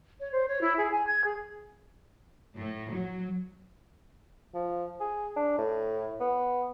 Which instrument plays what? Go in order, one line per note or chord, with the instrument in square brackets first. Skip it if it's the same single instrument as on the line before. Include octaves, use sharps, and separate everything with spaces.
[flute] C#5
C5
C#5
E4
G#4
G#5
G#6
G#4
[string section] A2
F#3
[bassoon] F3
G#4
D4
A2
B3